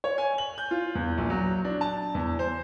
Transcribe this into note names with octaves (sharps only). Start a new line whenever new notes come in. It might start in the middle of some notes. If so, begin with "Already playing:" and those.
C#5
G#5
F#7
G6
F4
E2
A#1
F#3
D4
A5
E2
C5